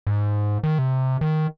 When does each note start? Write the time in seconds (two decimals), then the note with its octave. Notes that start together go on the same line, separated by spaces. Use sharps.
0.07 G#2
0.63 D#3
0.79 C3
1.21 D#3